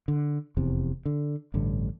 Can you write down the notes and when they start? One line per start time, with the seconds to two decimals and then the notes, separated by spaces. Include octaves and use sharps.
0.08 D3
0.57 F1 E2 C3
1.06 D3
1.54 A1 G2 D3